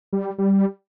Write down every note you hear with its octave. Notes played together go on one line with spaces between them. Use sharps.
G3
G3